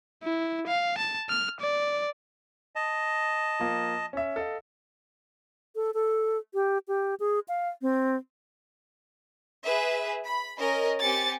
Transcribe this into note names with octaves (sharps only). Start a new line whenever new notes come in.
E4
F5
A5
F6
D5
D#5 A5
F3 A#3
C#4 E5
A4 D#5 F5
A4
A4
G4
G4
G#4
F5
C4
G#4 B4 E5
B5
C#4 A#4 D#5
C4 G4 G#5 A6 C#7